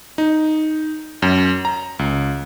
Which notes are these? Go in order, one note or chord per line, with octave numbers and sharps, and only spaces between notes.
D#4
F#2
A#5
C#2